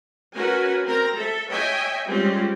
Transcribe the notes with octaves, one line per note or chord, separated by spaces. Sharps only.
C#4 F#4 A#4 B4 G#5
C4 A#4 A#5
A4 E5
C#5 D#5 E5 G5 G#5
G3 G#3 C4 C#4 F4 G4